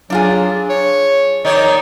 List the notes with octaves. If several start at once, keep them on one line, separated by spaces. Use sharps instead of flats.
F#3 D4 F4 G#4
C#5
D#3 D#4 C#5 D5